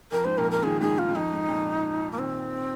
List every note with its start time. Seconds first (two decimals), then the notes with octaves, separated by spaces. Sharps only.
0.11 F2 A#4
0.24 G#2 C5
0.37 F2 A#2 A#4
0.51 A#4
0.63 A#2 D#3 G#4
0.81 G#2 G#4
0.98 G#2 F4
1.09 G#2
1.15 F2 D#4
1.32 G#2
1.49 F2 A#2
2.11 A#3
2.18 A#2 D#3 C4